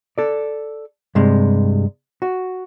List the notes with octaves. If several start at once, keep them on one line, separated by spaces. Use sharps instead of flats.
A4 D5
G2 C3 G#3
F#4